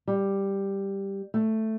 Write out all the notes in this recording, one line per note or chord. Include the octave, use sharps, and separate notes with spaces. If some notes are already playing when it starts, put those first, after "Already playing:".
G3
A3